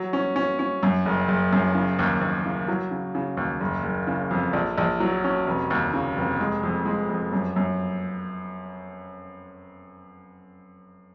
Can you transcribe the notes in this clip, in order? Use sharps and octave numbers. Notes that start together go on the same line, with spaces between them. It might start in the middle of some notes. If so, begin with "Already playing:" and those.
Already playing: F#3
C#4
C#4
C#4
F#2
F#1
F#1
F#2
C#3
D#2
D#2
C#3
F#3
C#3
C#3
D#2
F#1
F#1
C#3
F2
A#1
A#1
F#3
C#4
F1
D#2
C#3
F1
G#3
F2
G#3
F2
F#2
F#2